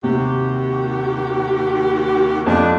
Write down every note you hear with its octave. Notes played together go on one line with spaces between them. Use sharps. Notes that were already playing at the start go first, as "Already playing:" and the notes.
D#2 C3 F#4 G4
F2 D4